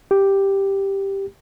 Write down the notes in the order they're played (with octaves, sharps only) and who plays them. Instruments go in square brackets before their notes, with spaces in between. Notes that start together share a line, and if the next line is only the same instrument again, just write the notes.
[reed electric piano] G4